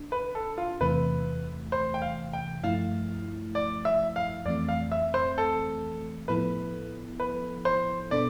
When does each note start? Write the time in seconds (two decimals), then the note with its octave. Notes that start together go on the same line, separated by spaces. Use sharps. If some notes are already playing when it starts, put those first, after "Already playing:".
Already playing: D4
0.12 B4
0.35 A4
0.58 F4
0.80 E2 C3 E3 A3 B4
1.72 C5
1.94 G5
2.02 F5
2.33 G5
2.63 G2 F3 A3 E4 F5
3.55 D5
3.85 E5
4.16 F5
4.46 F2 E3 A3 C4 D5
4.68 F5
4.92 E5
5.14 C5
5.38 A4
6.28 A2 F3 B3 E4 A4 B4
7.20 B4
7.65 C5
8.11 B2 B3 D4 A4 D5